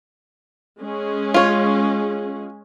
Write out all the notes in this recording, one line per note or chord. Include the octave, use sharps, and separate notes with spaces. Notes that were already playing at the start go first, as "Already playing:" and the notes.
G#3 C#4 G#4
F4 C#5